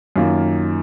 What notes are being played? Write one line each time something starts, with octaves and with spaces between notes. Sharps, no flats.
F#2 D#3 A#3 F4